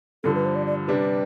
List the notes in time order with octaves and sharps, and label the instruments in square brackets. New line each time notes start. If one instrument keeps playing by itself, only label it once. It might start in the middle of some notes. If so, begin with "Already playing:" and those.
[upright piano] G2 D3 F3 [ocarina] A4
[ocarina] B4
C5
D5
D5
[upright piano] C3 G3 D4 [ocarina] B4